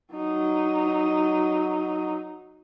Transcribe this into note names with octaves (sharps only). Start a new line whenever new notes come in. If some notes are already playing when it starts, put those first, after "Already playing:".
F#3 D#4